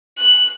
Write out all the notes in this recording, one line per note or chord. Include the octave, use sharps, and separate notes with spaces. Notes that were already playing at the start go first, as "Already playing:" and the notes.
F#6